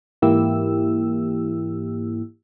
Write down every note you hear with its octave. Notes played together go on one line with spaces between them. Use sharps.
G#2 E3 A#3 E4 G4 E6